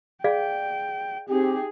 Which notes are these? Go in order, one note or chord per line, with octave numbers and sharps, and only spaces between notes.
G#4 D5 F5 G5
C4 D#4 G4 G#4